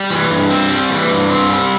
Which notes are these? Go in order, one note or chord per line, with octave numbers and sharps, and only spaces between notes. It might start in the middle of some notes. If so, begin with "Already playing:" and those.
Already playing: G3
E3
G2
C4
G3
E3
G2
C4
G3